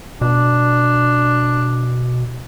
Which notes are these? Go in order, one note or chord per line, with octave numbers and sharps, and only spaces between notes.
B2 D4